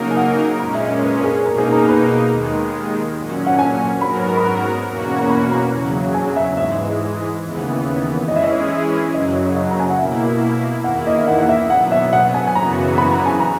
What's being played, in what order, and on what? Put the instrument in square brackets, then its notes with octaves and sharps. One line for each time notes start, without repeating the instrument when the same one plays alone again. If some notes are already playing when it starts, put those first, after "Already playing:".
Already playing: [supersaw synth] C#3 F#3 A#3 D#4 A#4
[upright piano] G#5
F#5
[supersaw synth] A#2 G#3 C#4 [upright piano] A#5
[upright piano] E5
D#5
B4
A#4
G#4
[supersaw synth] B2 A#3 D#4 [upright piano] A#4
[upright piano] G#4
A#4
B4
[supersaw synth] D#2 D#3 G#3
A#2 F#3 C#4
[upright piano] F#5
G#5
[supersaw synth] G#2 F#3 B3 F#4 A#4 [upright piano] B5
[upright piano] B5
A#5
[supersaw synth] E2 B2 A#3 C#4 F#4
[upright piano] A#5
B5
A#5
[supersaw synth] E2 C#3 F#3
[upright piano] G#5
E5
[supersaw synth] G#2 E3 G#3 [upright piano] E5
[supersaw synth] D#2 C#3 E3 B3
[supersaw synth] E3 G#3 C#4 E4 G#4 [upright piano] D#5
[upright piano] E5
D#5
[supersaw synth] F#2 C#3 F#3 [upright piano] D#5
[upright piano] D#5
A#5
G#5
F#5
[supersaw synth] B2 A#3 E4 [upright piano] E5
[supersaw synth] E2 D#3 A#3 E4 [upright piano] F#5
[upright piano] D#5
E5
F#5
F#5
E5
[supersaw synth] B2 F#3 B3 [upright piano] F#5
[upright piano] E5
F#5
G#5
G#5
[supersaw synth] F#2 C#3 E3 B3 F#4 [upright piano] A#5
[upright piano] B5
A#5
G#5
A#5